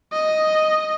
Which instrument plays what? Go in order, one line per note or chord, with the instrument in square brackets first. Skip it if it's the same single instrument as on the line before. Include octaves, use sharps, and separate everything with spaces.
[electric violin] D#5